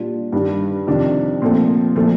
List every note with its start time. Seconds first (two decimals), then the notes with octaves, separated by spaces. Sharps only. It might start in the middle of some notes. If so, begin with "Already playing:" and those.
Already playing: A#2 G3 D4 F4
0.32 G2 D#3 G3
0.87 F2 C3 D#3 D4
1.42 A#2 F3 A3 C4
1.96 A#2 F3 A3